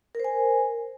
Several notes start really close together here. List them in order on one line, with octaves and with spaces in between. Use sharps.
A#4 C5 G#5